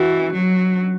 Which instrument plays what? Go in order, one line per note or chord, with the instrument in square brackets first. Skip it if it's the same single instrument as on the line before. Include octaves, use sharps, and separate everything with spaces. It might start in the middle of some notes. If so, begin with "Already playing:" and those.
Already playing: [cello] E3 [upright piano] F#4
[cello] F#3